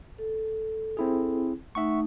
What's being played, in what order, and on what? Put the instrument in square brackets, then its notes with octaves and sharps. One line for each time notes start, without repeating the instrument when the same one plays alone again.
[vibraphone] A4
[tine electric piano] C4 E4 G#4
[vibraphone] A3 D#4 [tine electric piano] E5 F#5 C#6